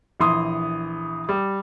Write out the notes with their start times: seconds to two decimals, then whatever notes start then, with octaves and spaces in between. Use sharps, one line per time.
0.20 A#1 E3 C6 D#6
1.29 G3